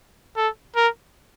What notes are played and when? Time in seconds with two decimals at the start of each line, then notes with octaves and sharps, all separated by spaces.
0.37 A4
0.76 A#4